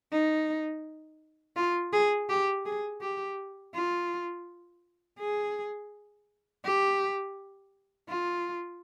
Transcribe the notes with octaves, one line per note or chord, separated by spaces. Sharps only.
D#4
F4
G#4
G4
G#4
G4
F4
G#4
G4
F4